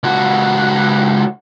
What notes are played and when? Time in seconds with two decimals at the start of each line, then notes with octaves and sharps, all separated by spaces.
0.04 C#2 F#4